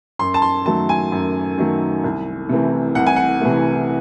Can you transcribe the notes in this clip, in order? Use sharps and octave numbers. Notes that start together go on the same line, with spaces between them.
F#2 C6
A5
C6
D#3 F#3 A3 A5
G#5
F#2
D#3 F#3 A3
C2
C3 E3 A3
C2 F#5
G#5
F#5
C3 E3 A3